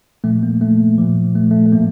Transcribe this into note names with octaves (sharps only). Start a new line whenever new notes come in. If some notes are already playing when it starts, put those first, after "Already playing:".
A#2 F3 A3
A#3
A3
A#2 F3
A3
A3
A3
A2 F3 A#3